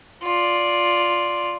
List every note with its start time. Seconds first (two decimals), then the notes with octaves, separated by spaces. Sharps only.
0.23 F4 D5